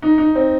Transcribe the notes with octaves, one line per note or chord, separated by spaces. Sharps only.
D#4
D#4
C4